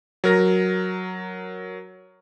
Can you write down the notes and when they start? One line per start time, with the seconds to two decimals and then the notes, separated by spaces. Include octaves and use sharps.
0.24 F#3 A#4 A#6